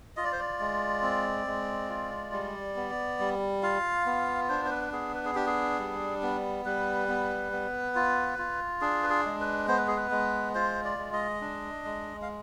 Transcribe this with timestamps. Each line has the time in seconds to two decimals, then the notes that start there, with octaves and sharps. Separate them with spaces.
0.17 F4 D#5
0.24 D5
0.32 C5
0.39 D5
0.60 G#3
1.02 C4
1.47 G#3
1.89 F4
2.32 G3
2.76 B3
3.19 G3
3.63 F4 F5
4.06 B3
4.49 D4 C5
4.65 C5
4.71 B4
4.92 B3 G#4
5.14 B4
5.25 G#4
5.35 D4 G4
5.47 G#4
5.79 G3
6.23 B3
6.65 G3 B4
7.08 B3
7.52 B3
7.95 F4
8.38 F4
8.81 D4 G#4
9.03 B4
9.10 G#4
9.26 G#3
9.40 B4
9.68 B3 C5
9.78 B4
9.88 G#4
9.97 B4
10.11 G#3
10.55 F4 C5
10.84 D5
10.98 G#3
11.13 D#5
11.41 D4
11.85 G#3
12.22 F5